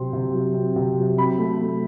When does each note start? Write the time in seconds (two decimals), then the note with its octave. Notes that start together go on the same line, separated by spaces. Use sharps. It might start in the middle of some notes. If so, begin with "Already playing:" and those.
Already playing: C3 F#3 C4 C6
0.13 C3
0.33 F#3
0.54 C4
0.76 C3
0.97 F#3
1.17 C4 B5
1.39 A3
1.60 A3